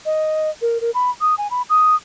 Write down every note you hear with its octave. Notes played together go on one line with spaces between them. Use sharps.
D#5
A#4
A#4
B5
D#6
G#5
B5
D#6